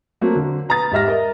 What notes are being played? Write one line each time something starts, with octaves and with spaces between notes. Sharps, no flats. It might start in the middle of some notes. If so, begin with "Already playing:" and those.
F#3 A3 A#3 C4
D3
B4 A#5 D#6 A6
G#2 G4 E5 F6 A#6
A#4 D#5